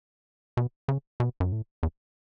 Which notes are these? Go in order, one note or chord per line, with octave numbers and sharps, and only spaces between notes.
B2
C#3
B2
F#2
A2
E2